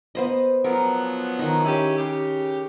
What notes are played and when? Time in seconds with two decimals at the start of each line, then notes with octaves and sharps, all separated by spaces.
0.15 B3 C5 D#5
0.64 F3 F#3 B3 A#4
1.39 D#3 D#4
1.64 C#4 E4 G4 G#4
1.97 C#3 G4